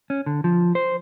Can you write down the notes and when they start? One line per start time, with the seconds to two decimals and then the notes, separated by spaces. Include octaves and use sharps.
0.10 C#4
0.26 D3
0.44 F3
0.75 C5